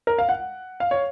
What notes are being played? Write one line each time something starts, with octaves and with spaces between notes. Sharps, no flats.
A#4
F5
F#5
F5
C#5